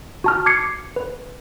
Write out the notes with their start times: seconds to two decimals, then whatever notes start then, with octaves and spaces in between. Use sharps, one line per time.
0.24 F#4 A5 F6
0.46 D6 G#6 C7 C#7
0.96 B4